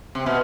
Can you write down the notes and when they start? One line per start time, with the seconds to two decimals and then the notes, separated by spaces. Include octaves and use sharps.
0.15 C3
0.26 B2